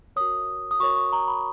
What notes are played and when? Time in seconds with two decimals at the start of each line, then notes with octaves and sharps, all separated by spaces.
0.16 F#4 A#4 C#5 D#6
0.71 D#6
0.80 F#4 A#4 C#5 C#6
0.96 C#6
1.12 A#5
1.28 B5